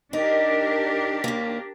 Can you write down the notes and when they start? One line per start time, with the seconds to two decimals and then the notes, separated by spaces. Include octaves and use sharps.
0.13 D4 D#4 G4 A#4
1.24 D#2 A#3